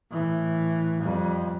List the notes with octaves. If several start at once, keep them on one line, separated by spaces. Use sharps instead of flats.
A2 E3
F2 G3